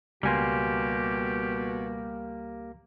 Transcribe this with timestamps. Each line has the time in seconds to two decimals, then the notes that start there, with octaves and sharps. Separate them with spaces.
0.23 C#2 B2 G3 A#3 G4 G#5 C6